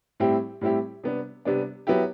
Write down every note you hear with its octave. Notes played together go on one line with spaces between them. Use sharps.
A2 G3 C4 E4 G4
A2 G3 C4 E4 G4
C3 G3 B3 D4
C3 G3 B3 D4
F#3 B3 E4 G4